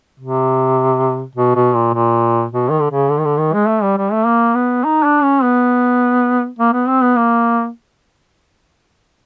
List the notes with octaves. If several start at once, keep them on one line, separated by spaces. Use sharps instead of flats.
C3
B2
B2
A#2
A#2
B2
D#3
D3
C#3
D3
D#3
D3
D#3
G#3
A3
G3
G3
A3
A#3
B3
D#4
D4
C#4
B3
A#3
B3
C4
B3
A#3